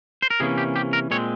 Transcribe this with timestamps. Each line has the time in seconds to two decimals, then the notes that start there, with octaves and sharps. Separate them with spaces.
0.22 C5
0.30 A#4
0.40 C3 E3 A#3 C#4 G#4
0.57 G4
0.76 G4
0.93 A#4
1.11 A#2 G#3 C4 C#5